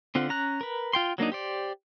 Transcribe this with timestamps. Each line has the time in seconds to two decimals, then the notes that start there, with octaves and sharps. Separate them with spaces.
0.15 D3 C4 F4 F#5
0.29 C#4 A#5 F#6
0.61 A#4 B4
0.93 F4 G5 C6
1.18 F#3 A#3 D4 D#4
1.32 G4 C5 D5